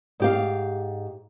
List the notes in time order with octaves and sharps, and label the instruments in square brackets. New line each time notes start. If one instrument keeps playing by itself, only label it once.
[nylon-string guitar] G#2 G4 F5